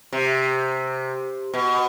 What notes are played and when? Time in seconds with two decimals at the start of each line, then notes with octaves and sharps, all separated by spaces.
0.13 C3
1.54 B2